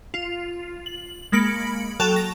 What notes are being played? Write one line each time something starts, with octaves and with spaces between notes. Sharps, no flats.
F4
F#7
G#3 A#3 B5 C#7 D7 F#7
F#3 A4 G5 A5 F7
A#6